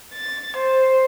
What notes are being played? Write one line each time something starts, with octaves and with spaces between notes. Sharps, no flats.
A6
C5